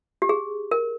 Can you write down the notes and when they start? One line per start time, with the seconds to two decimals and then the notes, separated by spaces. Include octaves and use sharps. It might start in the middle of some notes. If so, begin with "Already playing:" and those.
0.22 G4
0.29 G#4
0.71 A#4